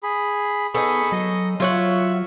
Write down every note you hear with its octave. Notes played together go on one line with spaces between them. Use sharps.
G#4 B5
B3 D#4 G#4 A4 B5 C#6
F#3 D#5
F#3 F4 C#5 E5 F#5